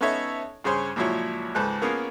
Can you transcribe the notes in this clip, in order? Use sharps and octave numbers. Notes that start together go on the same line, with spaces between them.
B3 C#4 D#4 A4 C#5 E5
G2 C#3 G#4 C5 C#5 C6
C#2 A#2 F3 F#3 E4 C#5
C#2 G#2 A4 B4 C5 F#6
A#3 B3 C#4 F4 G#4 A#4